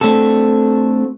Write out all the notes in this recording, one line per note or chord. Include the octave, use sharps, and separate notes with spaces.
A3 C4 D4 F#4 A4